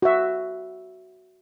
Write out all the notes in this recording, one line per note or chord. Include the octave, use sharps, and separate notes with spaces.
F#4 E5